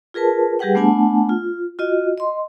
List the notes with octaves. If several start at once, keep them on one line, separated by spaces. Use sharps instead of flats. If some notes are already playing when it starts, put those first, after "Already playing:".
F4 G#4 A#4 B4 A5
G3 G4 G#4 B4 F#5 G5
A3 B3 D4 F#5 G#5 A5
F4
F4 F#4 D#5
D#5 C6